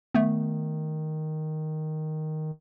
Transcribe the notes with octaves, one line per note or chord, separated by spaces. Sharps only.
D#3 A3 B3